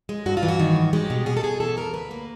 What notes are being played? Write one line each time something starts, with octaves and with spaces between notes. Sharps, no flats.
G#3
G2 F#4
F4
E3
F#4
D#3
G#2
G#3 G4
B2
B2 G#4
A4
B2 G#4
E3 A4
F2 A#4
D2 B4
A#3